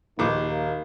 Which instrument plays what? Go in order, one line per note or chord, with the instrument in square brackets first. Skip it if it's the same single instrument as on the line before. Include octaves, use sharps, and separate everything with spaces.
[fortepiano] A#1 D6 [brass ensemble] D#2 A#3 D#4